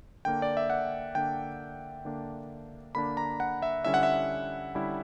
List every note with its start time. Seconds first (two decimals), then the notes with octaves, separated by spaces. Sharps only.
0.25 D3 A#3 D4 G5
0.42 D5
0.57 E5
0.70 F#5
1.15 D3 A#3 D4 G5
2.05 D3 A#3 D4
2.95 D3 A#3 D4 B5
3.17 A#5
3.40 F#5
3.62 E5
3.85 D3 G3 C#4 E4 E5
3.94 F#5
4.03 E5
4.75 D3 G3 C#4 E4